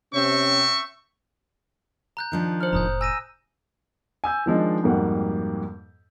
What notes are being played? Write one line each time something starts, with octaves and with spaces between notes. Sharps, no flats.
C3 C4 C#4 C#5 E5 C#6
A#5 F#6 G6
D#3 F3 D4
C5 F6
F1 A2 A#5 D#6 G6
G#5 E6 A#6 D#7
G#5 E6 G6
D#3 F3 G#3 D4
F2 G#2 G3 A#3 F#4 F#5